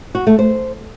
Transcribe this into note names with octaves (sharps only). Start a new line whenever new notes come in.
F#4
A3
C5